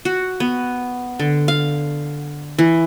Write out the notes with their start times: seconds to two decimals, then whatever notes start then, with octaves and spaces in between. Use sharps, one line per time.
0.05 F#4
0.40 B3
1.20 D3
1.48 F5
2.58 E3